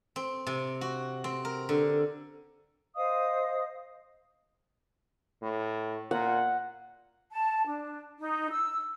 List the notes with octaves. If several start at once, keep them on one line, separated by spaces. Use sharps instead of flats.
C4
C3
F#4
C4
A#4
D3
C5 D#5 F5 D#6
A2
A#2 F#5
A5
D4
D#4
E6